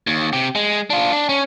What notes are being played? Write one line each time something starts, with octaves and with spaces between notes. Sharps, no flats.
D#2
C3 G4
G#3
D4 F4
D4
C#4